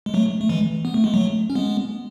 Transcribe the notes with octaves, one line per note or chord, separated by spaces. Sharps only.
G#3
F#3 A3
A3
E3 G#3
B3
A3
G#3
F#3 A3
C#4
G#3 B3